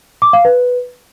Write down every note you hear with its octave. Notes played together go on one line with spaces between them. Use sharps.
D6
F5
B4